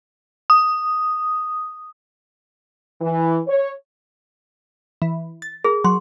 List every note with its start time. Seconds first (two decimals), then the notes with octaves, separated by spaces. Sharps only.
0.50 D#6
3.01 E3
3.47 C#5
5.02 E3
5.42 A6
5.64 G#4 A#4
5.84 F#3 C6